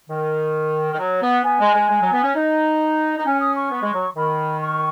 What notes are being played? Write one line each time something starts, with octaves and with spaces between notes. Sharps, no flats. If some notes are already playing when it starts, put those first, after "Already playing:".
D#3
D#3
F#3
B3
B3 G#5
G#3
G#3
G#3
F#3
B3
C#4
D#4 D#5
D#4
C#4 G#5
D#6
C#6
B3
G#3
F#3
D#3 B5
C#6